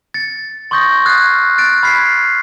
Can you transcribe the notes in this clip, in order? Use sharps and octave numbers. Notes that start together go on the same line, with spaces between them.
A6 C#7
C6 C#6 D#6 G6 A6 A#6
D#6 F6 F#6 G#6 A6 C7
F#6 A6 D7
B5 F6 G#6 B6 C7